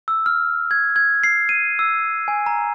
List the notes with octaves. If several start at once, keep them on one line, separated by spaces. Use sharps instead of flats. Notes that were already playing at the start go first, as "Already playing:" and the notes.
E6
F6
G#6
G#6
C7
D#7
E6
G#5
A#5